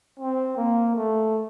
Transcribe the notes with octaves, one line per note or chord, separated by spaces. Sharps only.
C4
A#3
A3